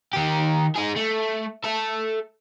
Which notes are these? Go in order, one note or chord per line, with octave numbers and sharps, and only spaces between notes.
D#3 G4
D#4 G#4
A3
A4 E5